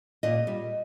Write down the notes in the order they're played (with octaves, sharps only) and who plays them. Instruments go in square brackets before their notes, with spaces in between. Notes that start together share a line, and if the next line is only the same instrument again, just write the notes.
[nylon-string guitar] A#2 D#5
G3